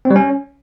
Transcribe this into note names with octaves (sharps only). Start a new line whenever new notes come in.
C4
G3
C#4